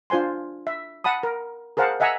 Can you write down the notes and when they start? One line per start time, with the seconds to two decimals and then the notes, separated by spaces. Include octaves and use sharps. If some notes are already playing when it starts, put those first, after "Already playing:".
0.10 D4 F4 C5 G#5 C6
0.67 E5
1.04 F#5 A5 B5 D#6
1.23 A#4
1.77 G#4 A#4 C5 F5 F#5 A5
2.00 D#5 E5 F#5 G#5 A#5 E6